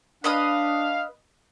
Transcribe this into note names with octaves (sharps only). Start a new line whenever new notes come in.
D4 B4 D#5 F5 D#6